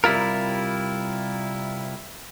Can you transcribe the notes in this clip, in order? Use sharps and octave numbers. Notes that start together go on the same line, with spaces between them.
C3 G3 E4 F4 A#4